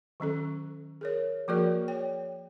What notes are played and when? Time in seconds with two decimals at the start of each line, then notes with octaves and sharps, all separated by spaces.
0.20 D#3 F#3 C#4 A4
1.01 G#4 A#4 C#5
1.48 F3 A#3 F#4 G#4 A#4 D5
1.88 C#5 G5